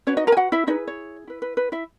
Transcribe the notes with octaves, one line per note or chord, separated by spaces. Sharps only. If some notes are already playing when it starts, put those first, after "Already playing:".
C#4 F#4 B4 C#5
D#4 D#5
A#4 A#5
G#5
F#4 F#5
E4 E5
D#4 E4 G#4 B4 D#5
C#5
E4 B4
B4
B4
E4 E5